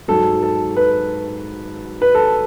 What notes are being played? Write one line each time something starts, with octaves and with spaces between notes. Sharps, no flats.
G#2 F#3 A4
A4
B4
B4
A4